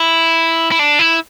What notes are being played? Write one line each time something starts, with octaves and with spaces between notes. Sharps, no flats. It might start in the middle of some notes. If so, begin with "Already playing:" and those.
Already playing: E4
E4
D4
E4